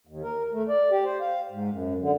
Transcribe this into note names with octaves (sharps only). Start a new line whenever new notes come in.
D#2
A#4
A3
D5
G4
C5
F5
G#2
F#2
D3